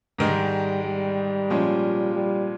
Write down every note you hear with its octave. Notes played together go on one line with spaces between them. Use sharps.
G#2 D#3 G3 G#3
G3
A#2 F3 G#3 C#4
G3